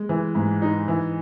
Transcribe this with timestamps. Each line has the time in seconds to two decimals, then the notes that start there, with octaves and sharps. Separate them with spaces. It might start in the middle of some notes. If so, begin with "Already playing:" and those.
Already playing: G#3
0.09 E3
0.35 G#2
0.62 D#4
0.88 E3